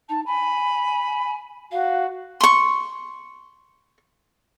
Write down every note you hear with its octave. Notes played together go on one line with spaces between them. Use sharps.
D#4 A5
G#5 B5
F#4 F5
C6 C#6